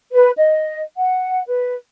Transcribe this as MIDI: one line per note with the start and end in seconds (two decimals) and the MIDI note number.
0.13 0.31 71
0.37 0.81 75
0.96 1.41 78
1.47 1.74 71